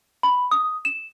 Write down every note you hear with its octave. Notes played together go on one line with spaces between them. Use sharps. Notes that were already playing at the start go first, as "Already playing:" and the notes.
B5
D#6
E7